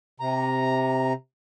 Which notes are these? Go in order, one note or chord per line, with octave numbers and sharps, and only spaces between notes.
C3 A#5